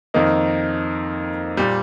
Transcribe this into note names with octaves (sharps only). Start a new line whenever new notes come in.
F2 D#3 A#3 D#4
A#2 G3